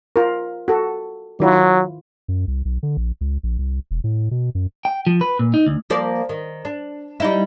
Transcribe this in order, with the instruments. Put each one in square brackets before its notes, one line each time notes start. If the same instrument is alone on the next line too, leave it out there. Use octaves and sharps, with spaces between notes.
[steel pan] F4 A#4
F#4 A4
[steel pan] D#3 E4 F4 [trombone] F#3
[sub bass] F#2
C2
B1
D3
A#1
C#2
A#1
C2
E1
A2
B2
F#2
[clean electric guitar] G5
F3
B4
A#2
D#4
D2
[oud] F3 A#3 D5
D#3
D4
G3 D#4 E4